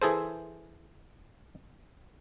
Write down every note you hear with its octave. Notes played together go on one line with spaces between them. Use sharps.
E3 G#4 A4 C5